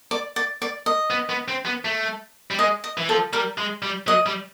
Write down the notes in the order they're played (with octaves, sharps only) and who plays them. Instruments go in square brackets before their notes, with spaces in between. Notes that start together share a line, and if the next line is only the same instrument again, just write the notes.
[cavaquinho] D5
D5
D5
D#5
[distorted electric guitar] B3
B3
C4
B3
A3
G3
[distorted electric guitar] G#3 [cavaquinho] D#5
[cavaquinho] D#5
[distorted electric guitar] E3
[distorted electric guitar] F3 [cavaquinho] A4
[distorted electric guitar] G3 [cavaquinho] A#4
[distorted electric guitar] G#3
G3
[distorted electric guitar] F#3 [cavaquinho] D#5
[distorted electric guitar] G3